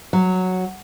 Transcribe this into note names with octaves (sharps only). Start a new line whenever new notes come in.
F#3